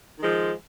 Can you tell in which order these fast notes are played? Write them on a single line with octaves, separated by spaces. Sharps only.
D#3 G#3 F3